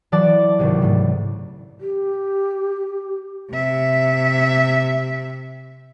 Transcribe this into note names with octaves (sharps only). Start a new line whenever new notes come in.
E3 F#3 D5 F#5 A5 D6
G#1 C#2 C3
G#2 A3
G4
C3 E5